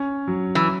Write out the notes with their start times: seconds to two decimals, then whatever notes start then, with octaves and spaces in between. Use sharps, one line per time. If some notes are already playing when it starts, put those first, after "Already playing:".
Already playing: C#4
0.28 F#3
0.55 E3